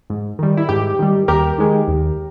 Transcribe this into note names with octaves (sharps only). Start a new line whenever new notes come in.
G#2
D#3 G3
E4
G#2 G4
D#3 G3
D#2 G4 A#4
D#3 G#3
D#2